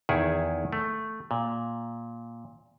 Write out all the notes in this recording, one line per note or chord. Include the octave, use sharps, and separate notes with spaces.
E2 D#3 E4 G#4
A3
A#2